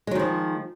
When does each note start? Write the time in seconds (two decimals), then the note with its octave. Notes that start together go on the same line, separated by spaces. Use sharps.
0.07 G#3
0.11 F#3
0.15 D#3
0.19 F3